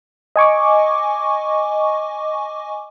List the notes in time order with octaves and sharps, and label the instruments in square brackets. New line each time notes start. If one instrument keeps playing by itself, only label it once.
[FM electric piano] D#5 G#5 C#6 D6